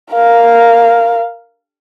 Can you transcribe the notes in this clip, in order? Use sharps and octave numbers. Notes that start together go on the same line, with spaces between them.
A#4 F5